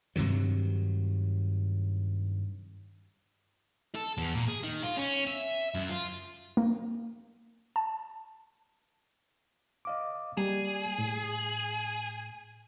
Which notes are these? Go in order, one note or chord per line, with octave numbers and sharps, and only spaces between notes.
G2 C3 D#3 F#3
A4
E2
A#2
G#4
D#3
F4
C#4
E5
F#2
F4
A#3
A5
D#5 F5 D6
G3 A#3 G#4 D5
A2